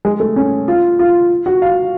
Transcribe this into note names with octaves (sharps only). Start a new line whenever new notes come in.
G#3
A3
C#4
F4
F4
F#4
F5